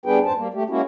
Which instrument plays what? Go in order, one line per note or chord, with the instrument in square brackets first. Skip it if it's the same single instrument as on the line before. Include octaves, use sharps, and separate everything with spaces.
[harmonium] G3 B3 D4 G#4 B4 G5
F2 G#2 C5 A5
G3 A#3
A3 G4
G#3 A#3 C#4 E4 F#4